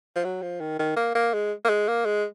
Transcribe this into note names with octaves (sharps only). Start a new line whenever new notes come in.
F3
F#3
F3
D#3
D#3
A#3
A#3
G#3
A#3
G#3
A#3
G#3